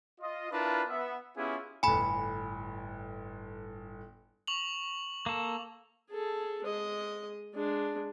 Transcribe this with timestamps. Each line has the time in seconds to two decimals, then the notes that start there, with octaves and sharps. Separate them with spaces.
0.21 F4 D#5
0.52 D4 E4 F4 A#4 B4 A5
0.88 B3 E5
1.37 B3 C#4 E4 F4 G4 G#4
1.83 G1 A2 G#5 B5
4.48 C#6 F7 F#7
5.26 A#3 A4
6.10 G#4 A4
6.64 G#3 D#5
7.54 G#3 D4